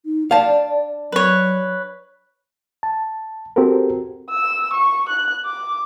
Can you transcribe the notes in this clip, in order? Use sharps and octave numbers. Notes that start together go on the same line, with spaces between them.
D#4
D4 D5 F5 A5
F#3 B4 C#5
A5
C4 F#4 G4 A4 A#4
E6
C#6
F#6
D6